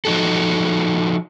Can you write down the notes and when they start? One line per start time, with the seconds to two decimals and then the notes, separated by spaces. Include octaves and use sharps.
0.05 F3 D#4 F#4 A4